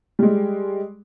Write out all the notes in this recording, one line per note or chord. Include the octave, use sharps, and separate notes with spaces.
G3 G#3